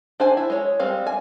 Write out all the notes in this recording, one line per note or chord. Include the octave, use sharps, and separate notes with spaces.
D4 C5 G#5
E4
G#3 C#5
G3 G#3 C4 F5
G#5